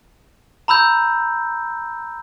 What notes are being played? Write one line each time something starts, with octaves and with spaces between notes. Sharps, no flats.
A#5 B5 E6 G6